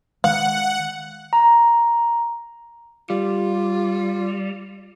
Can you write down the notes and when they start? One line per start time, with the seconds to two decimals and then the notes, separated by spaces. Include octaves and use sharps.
0.24 D#3 G#3 F5 F#5
1.33 A#5
3.10 G3 F4